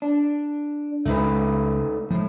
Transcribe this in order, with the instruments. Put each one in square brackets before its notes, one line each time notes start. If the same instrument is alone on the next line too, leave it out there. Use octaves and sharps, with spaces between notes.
[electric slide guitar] D4
[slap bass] C#2 [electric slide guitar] A3 D#4 B4
[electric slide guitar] A2 [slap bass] F3 G#3